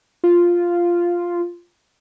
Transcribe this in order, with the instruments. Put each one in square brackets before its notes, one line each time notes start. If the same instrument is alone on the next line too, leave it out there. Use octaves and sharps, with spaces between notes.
[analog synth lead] F4